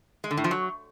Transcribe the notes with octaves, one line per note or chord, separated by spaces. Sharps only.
G#3
D3
A2
F3
F#3